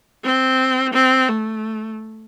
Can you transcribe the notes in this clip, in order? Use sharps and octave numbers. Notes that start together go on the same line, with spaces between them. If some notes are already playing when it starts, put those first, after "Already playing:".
C4
C4
A3